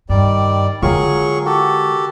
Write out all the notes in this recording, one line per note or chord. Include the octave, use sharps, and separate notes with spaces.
G2 D#3 G3 D5
D3 F#3 G#3 F4 G#4 A#4 G5 C#6
F#4 G4 A4